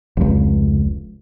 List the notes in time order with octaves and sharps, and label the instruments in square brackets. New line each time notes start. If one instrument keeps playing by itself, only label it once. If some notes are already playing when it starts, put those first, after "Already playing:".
[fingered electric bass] F1 C#2